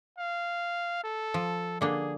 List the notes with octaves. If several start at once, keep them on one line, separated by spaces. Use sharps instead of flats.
F5
A4
F3
D3 A#3 D4 G#4